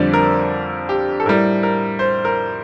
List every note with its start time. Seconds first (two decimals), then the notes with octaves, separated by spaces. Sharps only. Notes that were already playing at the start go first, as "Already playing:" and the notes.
Already playing: F2 D3 G3 D5
0.13 A#4
0.89 G4
1.20 A4
1.26 A2 G3 A#4
1.63 A#4
1.99 C5
2.25 A#4